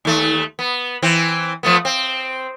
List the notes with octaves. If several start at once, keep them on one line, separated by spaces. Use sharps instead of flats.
D#2 A3
B3
E3 C4
F3 A3 B3
C4